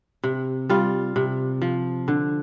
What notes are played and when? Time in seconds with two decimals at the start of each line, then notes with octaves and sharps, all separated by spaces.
0.23 C3
0.70 G3 F4
1.16 C3
1.62 F3
2.08 D3